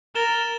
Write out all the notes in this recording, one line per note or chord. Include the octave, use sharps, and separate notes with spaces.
A#4 A6 E7 G7